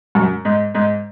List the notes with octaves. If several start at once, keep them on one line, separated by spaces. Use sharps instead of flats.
F#2
G#2
G#2